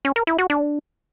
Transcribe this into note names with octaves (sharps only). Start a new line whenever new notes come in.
C#4
A#4
E4
F#4
D4